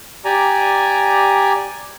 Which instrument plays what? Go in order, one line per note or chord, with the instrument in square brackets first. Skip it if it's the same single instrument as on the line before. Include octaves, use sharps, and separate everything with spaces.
[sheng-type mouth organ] G4 D5 G#5 A#5